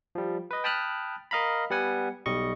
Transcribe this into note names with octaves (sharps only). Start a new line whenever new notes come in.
F3 G3
B4 D#5
G5 A5 B5 D#6 F6 F#6
A#4 D#5 F5 A#5 B5
G3 B3 F#5 G#5
B1 G3 D#5 C#6